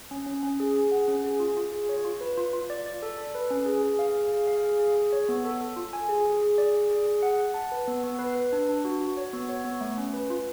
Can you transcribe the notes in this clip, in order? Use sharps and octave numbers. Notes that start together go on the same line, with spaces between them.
C#4
C#4
C#4
G#4
G#4
F#5
C#4
G#4
F4
F4
G#4
C#5
F4
B4
F4
F4
D5
D5
A4
A4
B4
C#4
G#4
G#4
F5
G#4
G#4
F5
G#4
G#4
G#4
C#5
B3
A4
A4
F4
G#5
G#4
G#4
G#4
D5
G#4
G#4
G#4
F#5
F#5
A5
B4
B3
B3
B4
B4
D4
D4
F#4
F#4
C#5
B3
C#5
B3
A3
C#4
B4
F4